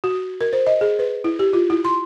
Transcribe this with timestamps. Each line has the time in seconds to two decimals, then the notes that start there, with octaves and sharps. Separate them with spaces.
0.04 F#4
0.41 A#4
0.53 C5
0.67 D#5
0.81 G#4
0.99 B4
1.24 E4
1.39 G4
1.53 F4
1.70 E4
1.85 C6